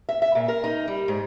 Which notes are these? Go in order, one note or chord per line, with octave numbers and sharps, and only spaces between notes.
E5
E5
A#2
A#4
D#4
G3
G#2